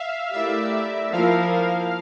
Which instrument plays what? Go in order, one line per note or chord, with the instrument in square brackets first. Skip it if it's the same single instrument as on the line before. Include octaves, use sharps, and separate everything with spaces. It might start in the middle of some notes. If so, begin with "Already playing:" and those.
Already playing: [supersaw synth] E5 F5
[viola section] A3 E4 G4 A#4 D5 [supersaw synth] E5
[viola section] F3 A#3 E4 A#4 [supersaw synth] F5